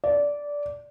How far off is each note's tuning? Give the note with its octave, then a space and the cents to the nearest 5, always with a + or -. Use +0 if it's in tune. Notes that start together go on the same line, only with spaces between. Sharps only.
D5 -15